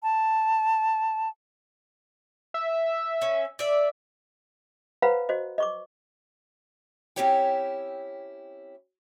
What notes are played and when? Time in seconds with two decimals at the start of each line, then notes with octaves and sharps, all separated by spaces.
0.03 A5
2.54 E5
3.22 C#4
3.59 D5 E5
5.02 B4 C5 F5 F#5 A#5 B5
5.29 F#4 C5 D#5
5.58 D#5 C#6 D6
7.16 C4 C#4 E4 G4 C#5 G5